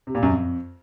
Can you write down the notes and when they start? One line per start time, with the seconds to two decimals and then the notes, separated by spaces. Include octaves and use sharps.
0.07 C3
0.15 A#2
0.23 F#2
0.30 F2